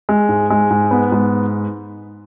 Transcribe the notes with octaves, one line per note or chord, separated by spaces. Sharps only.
G#3
G#2
G#3
G#2
B3
G#2